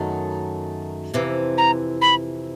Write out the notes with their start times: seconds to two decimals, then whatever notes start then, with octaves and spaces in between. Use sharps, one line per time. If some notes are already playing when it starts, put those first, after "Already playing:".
Already playing: F#2 D#3 F#3 A3
1.14 F2 C3 E3
1.58 A#5
2.01 B5